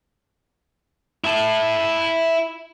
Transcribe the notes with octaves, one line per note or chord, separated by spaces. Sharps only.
E4 A5